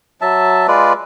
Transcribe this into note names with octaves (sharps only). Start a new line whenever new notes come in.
F#3 E5 A5
G#3 F4 B4 D5